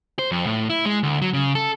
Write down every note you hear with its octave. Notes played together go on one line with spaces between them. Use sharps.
C5
F2
A2
E4
G#3
D2
F#3
C#3
A4